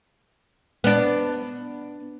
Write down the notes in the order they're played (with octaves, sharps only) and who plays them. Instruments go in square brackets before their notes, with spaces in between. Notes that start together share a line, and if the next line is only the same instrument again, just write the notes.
[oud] B3 D4